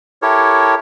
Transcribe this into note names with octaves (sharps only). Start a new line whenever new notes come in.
E4 G4 A4 A#4 C#5